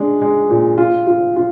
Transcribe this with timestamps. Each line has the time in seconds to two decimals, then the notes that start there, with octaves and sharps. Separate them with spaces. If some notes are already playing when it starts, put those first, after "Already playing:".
Already playing: G#3 D4
0.21 G#3
0.50 A#2
0.78 F4
1.07 F4
1.36 F4